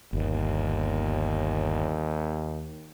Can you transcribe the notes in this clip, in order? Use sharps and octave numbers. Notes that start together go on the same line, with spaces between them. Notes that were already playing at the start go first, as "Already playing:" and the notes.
G1 D#2